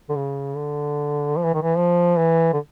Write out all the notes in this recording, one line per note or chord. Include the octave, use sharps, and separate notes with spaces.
D3
C#3
D3
F3
E3
D#3
E3
F3
E3
D3